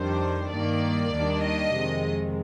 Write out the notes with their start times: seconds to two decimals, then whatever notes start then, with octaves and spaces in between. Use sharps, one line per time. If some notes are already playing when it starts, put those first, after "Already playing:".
Already playing: F2 D#3 G3 D4 C5
0.51 G2 D#3 A#3 D5
1.11 D#2 D#3 G3 A#3 D4
1.42 D#5
1.73 F2 C3 D#3 G#3